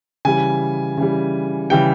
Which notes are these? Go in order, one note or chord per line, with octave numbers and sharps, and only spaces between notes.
C#3 E3 G3 G#5
C#3 E3 G3
C#3 E3 G3 G5